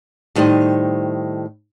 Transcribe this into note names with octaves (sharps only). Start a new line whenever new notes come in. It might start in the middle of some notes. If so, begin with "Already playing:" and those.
A2 D#3 G3 C5 D#5